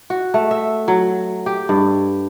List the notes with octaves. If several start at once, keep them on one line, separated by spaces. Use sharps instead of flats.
F#4
A3
E5
F#3
G4
G2